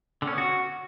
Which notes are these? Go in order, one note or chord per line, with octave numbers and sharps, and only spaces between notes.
D3
C#4
B3
F#4